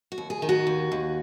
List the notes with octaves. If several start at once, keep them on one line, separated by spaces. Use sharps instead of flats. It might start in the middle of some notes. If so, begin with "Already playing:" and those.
F#4
D#2
G#4
D#3
F#4
D#2
D#2